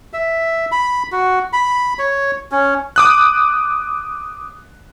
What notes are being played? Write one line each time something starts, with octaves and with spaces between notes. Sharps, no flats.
E5
B5
F#4
B5
C#5
C#4
D6 D#6 F#6